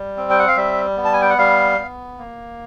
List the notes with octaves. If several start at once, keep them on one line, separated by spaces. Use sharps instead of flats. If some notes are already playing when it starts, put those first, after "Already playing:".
Already playing: G3
C4
G5
F#5
F5
G3 E5
B3
A5
G#5
G5
F#5
G3 F5
B3
A#3